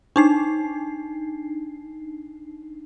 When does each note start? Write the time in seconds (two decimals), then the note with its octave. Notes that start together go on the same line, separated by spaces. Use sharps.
0.16 D4 D#4 C7